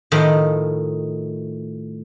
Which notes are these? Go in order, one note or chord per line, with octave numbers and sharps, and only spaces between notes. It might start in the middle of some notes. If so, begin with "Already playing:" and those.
A2 D#3 F3 A3 D#4